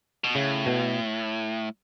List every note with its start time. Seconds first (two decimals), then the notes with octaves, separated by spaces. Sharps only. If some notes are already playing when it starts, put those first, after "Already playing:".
0.24 B2
0.35 A2 C#3
0.66 B2